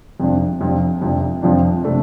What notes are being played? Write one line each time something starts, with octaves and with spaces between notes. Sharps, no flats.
F2 C3 F3 D4
F2 C3 F3 D4
F2 C3 F3 D4
F2 C3 F3 D4
C3 A3 D4